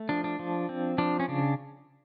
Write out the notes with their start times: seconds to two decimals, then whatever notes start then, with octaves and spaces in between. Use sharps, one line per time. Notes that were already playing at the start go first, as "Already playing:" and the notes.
Already playing: A3
0.09 F3 D4
0.24 D4
0.39 F3
0.69 C4
0.98 F3 D4
1.20 C#4
1.28 C#3 D4